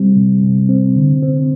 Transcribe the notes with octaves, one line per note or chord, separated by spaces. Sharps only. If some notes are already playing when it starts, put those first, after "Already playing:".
Already playing: C3 G3 C4
C3
C3
C4
D3
C4